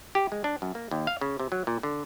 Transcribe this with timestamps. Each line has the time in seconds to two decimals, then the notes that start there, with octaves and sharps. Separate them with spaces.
0.15 G4
0.32 G#3
0.44 D4
0.62 F#2
0.75 A#3
0.91 D#2
1.07 F5
1.21 C#3
1.40 C3
1.52 F#3
1.67 A#2
1.83 D3